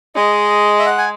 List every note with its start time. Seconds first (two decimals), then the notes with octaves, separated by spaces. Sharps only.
0.15 G#3 D#5
0.79 E5
0.86 F#5
0.98 G#5